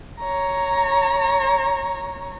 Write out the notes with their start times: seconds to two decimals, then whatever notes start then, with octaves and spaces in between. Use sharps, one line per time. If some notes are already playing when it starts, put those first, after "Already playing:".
0.20 C#5 A#5